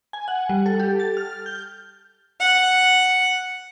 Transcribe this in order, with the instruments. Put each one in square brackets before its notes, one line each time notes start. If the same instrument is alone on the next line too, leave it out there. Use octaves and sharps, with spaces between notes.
[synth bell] G#5
F#5
G3
A4
G4
A6
F6
G6
[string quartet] F#5